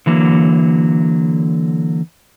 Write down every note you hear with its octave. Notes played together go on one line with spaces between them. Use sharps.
D3 E3 F#3 A#3